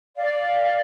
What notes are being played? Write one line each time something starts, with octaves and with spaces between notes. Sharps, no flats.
D5 F5